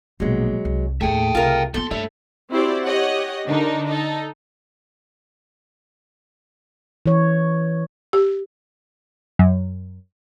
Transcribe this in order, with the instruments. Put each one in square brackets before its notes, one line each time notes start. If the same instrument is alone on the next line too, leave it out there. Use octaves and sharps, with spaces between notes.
[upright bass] A#1 B2 [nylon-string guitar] F#3 G#3
[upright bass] C2
[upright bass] D#2 A2 [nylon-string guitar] A3 G#4 [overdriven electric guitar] E5 G5
[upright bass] C2 C#3 [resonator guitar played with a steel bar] F4 A#4
[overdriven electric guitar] C#2 C6 [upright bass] B3 F4 [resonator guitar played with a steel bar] A4
[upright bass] G2 [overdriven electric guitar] A3 C#5 [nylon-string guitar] E5
[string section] C4 E4 F#4 G4 C5 D5
G4 C#5 D#5 F#5
D3 D4 D#4 A#4
D#4 A4
[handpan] E3 C#5
[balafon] G4
[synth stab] F#2